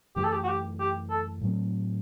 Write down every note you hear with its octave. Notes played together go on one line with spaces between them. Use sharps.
F#2 E3 A3 G4
A4
G4
F#4
G4
G4
A4
A2 F#3 A3 C4